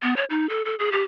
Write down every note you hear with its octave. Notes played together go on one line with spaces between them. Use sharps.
B3
C#5
D#4
A4
A4
G#4
G4